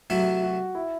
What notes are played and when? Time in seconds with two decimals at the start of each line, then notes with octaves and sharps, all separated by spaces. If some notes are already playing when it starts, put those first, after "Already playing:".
0.10 C3 F#3 A3 E4 F#4
0.43 F#4
0.75 E4